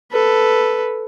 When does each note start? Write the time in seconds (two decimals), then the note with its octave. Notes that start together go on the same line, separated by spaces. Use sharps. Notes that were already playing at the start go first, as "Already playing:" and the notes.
0.12 A4 B4